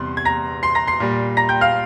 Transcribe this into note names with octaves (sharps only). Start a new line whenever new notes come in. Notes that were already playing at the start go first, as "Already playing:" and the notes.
Already playing: E2 C3 G3 C6
G#6
A#5 A#6
C6 C7
A#5 A#6
C6 C7
A#2 G3
A#5 A#6
G5 G6
F5 F6